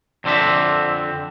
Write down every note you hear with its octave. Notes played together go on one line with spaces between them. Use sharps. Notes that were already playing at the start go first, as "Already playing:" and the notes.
F2 D3 C4 D4 E5